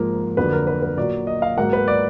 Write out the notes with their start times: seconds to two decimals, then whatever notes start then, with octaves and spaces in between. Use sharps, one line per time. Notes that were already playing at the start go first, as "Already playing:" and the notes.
Already playing: G#2 F3 A#3
0.37 F2 D3 F#3 A#3 B4
0.53 A#4
0.67 B4
0.82 B4
0.98 A#2 F#3 A#3 D5
1.27 D#5
1.42 F5
1.57 G#2 F#3 A#3 F#5
1.73 B4
1.88 D5